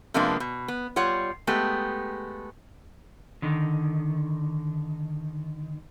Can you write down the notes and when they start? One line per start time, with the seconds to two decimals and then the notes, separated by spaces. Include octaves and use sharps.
0.14 C3 F3 G#3 A#3 B3 D4
0.40 B2
0.68 B3
0.96 G3 F4 C#5 F#5
1.47 G#3 A3 B3 G4
3.42 D3 D#3